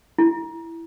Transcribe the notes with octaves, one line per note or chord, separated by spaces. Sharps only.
E4